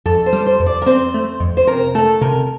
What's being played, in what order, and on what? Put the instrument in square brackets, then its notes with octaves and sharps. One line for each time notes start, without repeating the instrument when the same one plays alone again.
[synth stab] F2 [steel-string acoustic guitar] A4
[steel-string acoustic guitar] C5
[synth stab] G3
[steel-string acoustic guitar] C5
[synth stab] F2
[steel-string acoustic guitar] D5
A#4
[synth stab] C4 [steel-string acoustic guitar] C5
[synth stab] A3
F2
[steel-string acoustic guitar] C5
[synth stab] C3 [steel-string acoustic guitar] A#4
[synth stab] A3 [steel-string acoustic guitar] A4
[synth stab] C3 [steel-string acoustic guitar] A#4